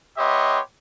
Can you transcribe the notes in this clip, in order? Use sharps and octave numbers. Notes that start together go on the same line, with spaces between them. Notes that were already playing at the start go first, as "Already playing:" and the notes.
B3 G4 C#5 D#5 E5 C6